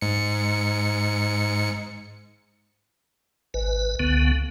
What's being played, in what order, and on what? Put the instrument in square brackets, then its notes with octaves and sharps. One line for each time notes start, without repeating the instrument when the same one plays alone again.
[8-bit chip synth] G#2 C#7
[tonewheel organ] G#1 B4
C#2 D3 B3